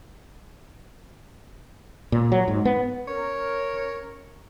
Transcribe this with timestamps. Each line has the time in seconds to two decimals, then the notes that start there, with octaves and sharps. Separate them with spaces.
2.12 A#2
2.32 F#3
2.48 G#2
2.65 B3
3.08 C#4 A#4 C#5